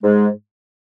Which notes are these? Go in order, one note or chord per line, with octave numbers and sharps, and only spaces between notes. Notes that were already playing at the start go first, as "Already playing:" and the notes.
G#2 G#3